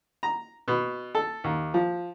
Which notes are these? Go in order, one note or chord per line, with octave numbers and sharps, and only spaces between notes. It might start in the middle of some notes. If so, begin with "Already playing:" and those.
A#5
B2
A4
D#2
F3